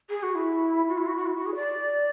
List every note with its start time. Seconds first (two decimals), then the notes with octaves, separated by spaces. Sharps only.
0.09 G#4
0.23 F#4
0.35 E4
0.88 F#4
0.98 E4
1.07 F#4
1.17 F#4
1.26 E4
1.36 F#4
1.46 G#4
1.56 D5